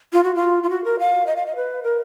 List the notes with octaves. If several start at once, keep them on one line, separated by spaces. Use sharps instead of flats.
F4
F#4
F4
F4
F#4
A#4
F5
D#5
F5
D#5
B4
A#4